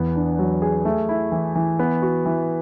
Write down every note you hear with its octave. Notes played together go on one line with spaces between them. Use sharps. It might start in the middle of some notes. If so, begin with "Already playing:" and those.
Already playing: E2 B3
D4
F#3
G#4
A3
E4
E3
E3
B3
F#4
E3